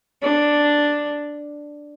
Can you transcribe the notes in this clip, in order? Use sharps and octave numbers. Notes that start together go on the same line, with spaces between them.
D4